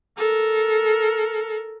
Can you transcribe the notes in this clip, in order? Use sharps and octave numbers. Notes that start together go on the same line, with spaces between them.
A4 A#4